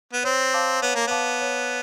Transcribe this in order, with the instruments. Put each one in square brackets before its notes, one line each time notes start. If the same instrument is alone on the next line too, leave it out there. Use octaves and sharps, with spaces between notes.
[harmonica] B3
[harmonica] C4 [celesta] C#5
[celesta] F5 A5 D6
[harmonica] B3 [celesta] C#5
[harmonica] A#3
[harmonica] B3 [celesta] F5 A5 D6
[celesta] C#5